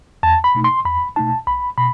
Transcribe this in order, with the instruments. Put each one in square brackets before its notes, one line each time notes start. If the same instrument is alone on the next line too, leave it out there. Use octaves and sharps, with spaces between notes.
[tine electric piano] E2 A5
B5
B2 A3 D#4
C6
E2 B5
B2 A3 D#4 A5
B1 B5
B2 B5